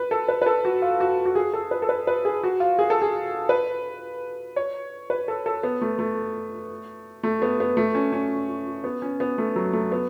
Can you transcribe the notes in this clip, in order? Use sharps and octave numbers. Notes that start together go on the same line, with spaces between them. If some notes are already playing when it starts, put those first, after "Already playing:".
Already playing: B4
A4
B4
B4
A4
F#4
F4
F#4
F#4
G#4
A4
B4
A4
B4
B4
G#4
F#4
F4
G#4
A4
G#4
B4
C#5
B4
A4
A4
B3
A3
A3
A3
B3
B3
A3
C#4
C#4
B3
C#4
B3
A3
F#3
A3
B3